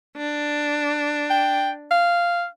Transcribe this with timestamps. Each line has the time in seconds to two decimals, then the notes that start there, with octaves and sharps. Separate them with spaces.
0.16 D4
1.30 G5
1.91 F5